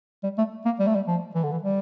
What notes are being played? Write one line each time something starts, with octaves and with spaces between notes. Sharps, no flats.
G3
A3
A#3
G3
A3
G3
F3
E3
D3
E3
G3